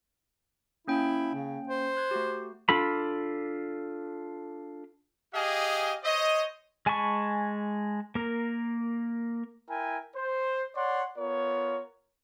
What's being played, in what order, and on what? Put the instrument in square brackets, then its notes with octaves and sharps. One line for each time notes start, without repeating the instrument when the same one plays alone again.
[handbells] A#3 C#4 G5 [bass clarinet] E4
[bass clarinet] C#3
C5
[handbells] F#6 G#6
A3 F#4 G4
[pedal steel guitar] D4 F4 A4 B5
[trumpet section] G4 G#4 D#5 F5 G#5
C5 C#5 D#5
[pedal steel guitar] G#3 G#5 A5 B5 C#6
A#3 A#4
[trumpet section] E4 A#4 G5 G#5
C5
C#5 D5 F#5 C6
B3 F4 A#4 C#5